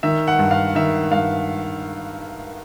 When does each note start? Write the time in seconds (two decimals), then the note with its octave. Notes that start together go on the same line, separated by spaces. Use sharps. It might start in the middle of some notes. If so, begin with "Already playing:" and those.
0.03 D#3 E5
0.28 F#5
0.39 G2
0.51 F5
0.75 D#3 E5
1.12 G2 F5